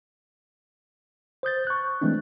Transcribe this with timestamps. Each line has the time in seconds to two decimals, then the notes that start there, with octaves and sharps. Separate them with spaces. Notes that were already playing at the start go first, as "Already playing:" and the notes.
1.43 C5 D#6 G6 A6
1.67 C#6 F#6
2.01 E3 G#3 A3 C4 D4